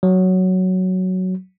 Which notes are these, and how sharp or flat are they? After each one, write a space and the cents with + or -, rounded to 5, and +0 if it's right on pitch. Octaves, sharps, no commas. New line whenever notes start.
F#3 +5